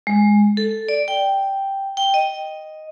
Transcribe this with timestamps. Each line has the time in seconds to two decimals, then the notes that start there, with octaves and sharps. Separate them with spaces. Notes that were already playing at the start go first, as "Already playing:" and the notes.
0.07 G#3
0.57 A4
0.88 D5
1.08 G5
1.97 G5
2.14 D#5